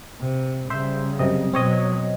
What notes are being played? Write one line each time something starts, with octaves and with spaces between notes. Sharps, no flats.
C3
C#3 G3 C5 E5
F#2 C3 D#5
B2 F#3 C4 C#5 D#5